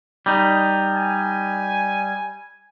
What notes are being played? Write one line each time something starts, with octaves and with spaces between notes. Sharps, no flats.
G3 D#4
G#5